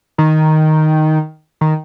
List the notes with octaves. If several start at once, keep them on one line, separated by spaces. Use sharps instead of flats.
D#3
D#3